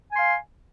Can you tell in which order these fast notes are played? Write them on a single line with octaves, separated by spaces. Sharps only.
G#5 C6 F5